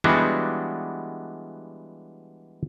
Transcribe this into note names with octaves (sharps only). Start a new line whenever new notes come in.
E3 G3 G#3 B3 D4 F#4